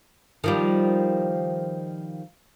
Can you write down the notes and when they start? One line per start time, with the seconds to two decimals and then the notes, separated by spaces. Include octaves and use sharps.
0.44 D#3 F3 G3